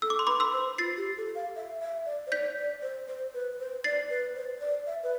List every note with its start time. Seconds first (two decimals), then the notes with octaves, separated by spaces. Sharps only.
0.02 A4 E6
0.10 D6
0.19 C6
0.27 B4 B5 D6
0.40 C6 E6
0.53 C5
0.78 F4 A6 C7
0.97 G4
1.17 A4
1.35 F5
1.56 E5
1.81 E5
2.06 D5
2.27 C5
2.32 D5 G6 B6
2.56 D5
2.82 C5
3.08 C5
3.34 B4
3.60 C5
3.84 D5 A6 C7
4.10 B4
4.35 C5
4.61 D5
4.87 E5
5.03 B4